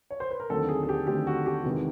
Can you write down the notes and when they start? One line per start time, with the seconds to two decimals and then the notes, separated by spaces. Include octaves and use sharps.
0.11 C#5
0.20 C5
0.31 B4
0.40 A#4
0.50 D#2 D3 F#3 A3 C4 A4
0.69 G#4
0.83 G#4
0.89 G4
1.07 D#2 D3 F#3 A3 C4 G4
1.27 F#4
1.46 G4
1.64 E2 C3 D#3 G#3